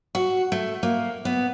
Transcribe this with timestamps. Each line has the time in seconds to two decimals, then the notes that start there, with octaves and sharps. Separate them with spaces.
0.15 F#4
0.52 A3
0.83 A#3
1.25 B3